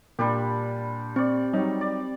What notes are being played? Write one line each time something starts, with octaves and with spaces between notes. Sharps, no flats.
A#2 G3 D4 G4
C4 D5 C#6
F#3 G3 D#4
D5